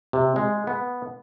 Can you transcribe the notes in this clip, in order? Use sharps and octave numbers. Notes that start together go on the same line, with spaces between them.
C3
G#3
B3